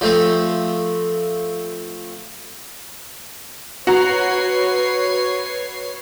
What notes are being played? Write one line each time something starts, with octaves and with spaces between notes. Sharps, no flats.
F3 A3 C4
F#4 B4 C#5 A#5 C7